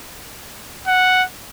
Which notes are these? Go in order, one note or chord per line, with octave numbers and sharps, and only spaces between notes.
F#5